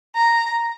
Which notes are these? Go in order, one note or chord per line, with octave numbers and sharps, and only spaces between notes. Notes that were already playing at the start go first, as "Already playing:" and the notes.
A#5